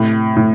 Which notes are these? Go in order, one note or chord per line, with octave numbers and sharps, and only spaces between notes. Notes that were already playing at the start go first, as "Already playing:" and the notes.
Already playing: A2 C3
A2